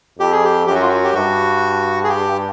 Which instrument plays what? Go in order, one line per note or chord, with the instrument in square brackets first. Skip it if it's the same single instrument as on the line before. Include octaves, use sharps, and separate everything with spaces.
[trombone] F2 [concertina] G4
[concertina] G#4
G4
[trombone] F#2 [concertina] G4
[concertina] F#4
F4
F#4
G4
[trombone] G2 [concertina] F#4
[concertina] G#4
G4